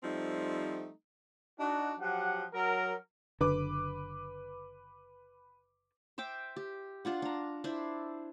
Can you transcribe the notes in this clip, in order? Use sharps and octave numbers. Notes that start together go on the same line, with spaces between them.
F3 G3 A3 C4 D#4
D4 D#4 F#4
F3 F#3 G4 F#5
F#3 A#4
F#1 D3 B4 D6
C5 E5 G5 D6
G4
D4 F4 F#5
D4 A#5
D4 E4 C5